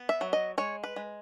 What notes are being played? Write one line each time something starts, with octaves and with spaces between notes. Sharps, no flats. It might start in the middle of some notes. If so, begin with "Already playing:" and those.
Already playing: B3
E5
F#3
D#5
G#3 C#5
B4
G#3